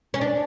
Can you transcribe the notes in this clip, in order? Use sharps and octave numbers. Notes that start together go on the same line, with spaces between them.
C#4
D4